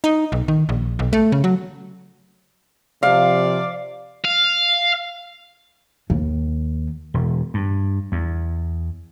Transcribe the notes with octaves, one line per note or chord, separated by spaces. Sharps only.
D#4
B1
D#3
A#1
B1
A3
C#3
F#3
C3 F3 D5 F5
F5
D#2
E1
G2
E2